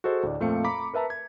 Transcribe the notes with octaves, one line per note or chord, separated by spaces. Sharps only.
F#4 G#4 A4 C5 D#5
D2 A2 D5
F2 A#2 A3 C4 F5 C#7
A#5 B5 D6 B6
A#4 B4 E5 A5 A#5
G#6